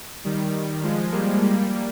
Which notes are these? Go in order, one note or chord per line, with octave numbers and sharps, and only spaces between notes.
D#3 G3
F3 G#3
G3 A#3
G3 A#3